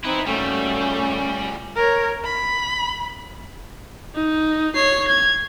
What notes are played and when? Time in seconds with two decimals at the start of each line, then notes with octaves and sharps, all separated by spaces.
0.04 C4 D#4 E4 B4
0.27 G3 A3 A#3 C#4 F#4
0.81 F4 G#4
1.76 A#4 C#5
2.24 B5
4.15 D#4
4.75 C#5 C7
5.08 G#6